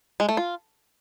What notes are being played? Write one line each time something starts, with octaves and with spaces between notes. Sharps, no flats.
G#3
A3
F4